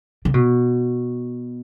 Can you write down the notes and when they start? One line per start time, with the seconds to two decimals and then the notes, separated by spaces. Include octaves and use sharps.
0.25 C#3
0.34 B2